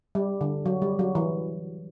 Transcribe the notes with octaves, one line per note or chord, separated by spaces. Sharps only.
G3
D3
F#3
G3
F#3
E3